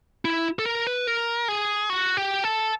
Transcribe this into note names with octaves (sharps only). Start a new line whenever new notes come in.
E4
A4
A#4
B4
A#4
G#4
F#4
G4
A4